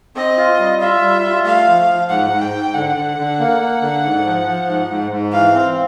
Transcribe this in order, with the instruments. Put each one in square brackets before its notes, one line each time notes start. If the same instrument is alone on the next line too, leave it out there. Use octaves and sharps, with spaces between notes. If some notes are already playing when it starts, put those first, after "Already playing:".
[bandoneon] C4 [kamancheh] D#5
[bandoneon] F4
G3
[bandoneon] F4 [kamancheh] E5
[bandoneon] G3
F4
[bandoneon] A3 [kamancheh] F5
[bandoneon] F3
F3
[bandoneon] G#2 [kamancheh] F#5
[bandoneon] G#2
[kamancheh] G5
[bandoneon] G#2
[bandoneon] D3 [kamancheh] F#5
[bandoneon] D3
D3
A#3
A#3
D3
G#2
F3
F3
G#2
G#2
G#2
[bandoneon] E3 [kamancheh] F5
[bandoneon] C4